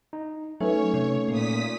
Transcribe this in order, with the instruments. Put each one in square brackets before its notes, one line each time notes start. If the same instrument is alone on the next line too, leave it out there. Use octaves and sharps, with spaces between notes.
[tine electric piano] D#4
[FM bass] F#3 [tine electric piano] A3 C#4 [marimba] D#4 B4 [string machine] C#5
[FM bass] C3
[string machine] A#2 D#6 B6 [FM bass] A#3